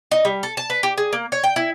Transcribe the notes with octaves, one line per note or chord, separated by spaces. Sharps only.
D#4
G3
A4
A5
B4
G4
G#4
A#3
C#5
G5
E4